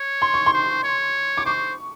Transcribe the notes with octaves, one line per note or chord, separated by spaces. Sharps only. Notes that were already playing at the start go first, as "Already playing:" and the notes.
Already playing: C#5
C6
C#6
C6
C5
C#5
D6
C5 C#6